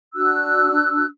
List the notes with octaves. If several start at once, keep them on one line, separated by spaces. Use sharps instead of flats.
D4 F#4 E6 F#6